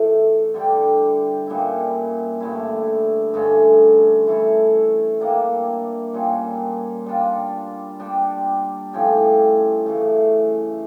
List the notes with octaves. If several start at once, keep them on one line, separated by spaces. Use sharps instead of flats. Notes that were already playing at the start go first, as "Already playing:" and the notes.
Already playing: A2 E3 A3
D3 G3 D4 G4
A#2 G3 C#4 E4
G2 D3 A3 E4
G2 D3 A3 C#4
E3 A3 E4 A4
G3 A#3 D4
A#2 G3 C#4 F4
G3 D4 F4
G3 D4 G4
A2 F3 C#4 G4
C#3 E3 A3